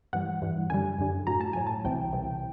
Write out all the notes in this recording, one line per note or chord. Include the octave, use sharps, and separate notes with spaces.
G2 E3 G3 F#5
G2 E3 G3
F#2 D3 G3 G#5
F#2 D3 G3
A2 F#3 A#5
A5
A2 F#3 G#5
A5
C2 C3 E3 G5
C2 C3 E3